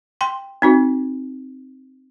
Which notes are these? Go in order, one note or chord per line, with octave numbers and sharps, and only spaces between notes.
G5 C6
C4 D#4 F#4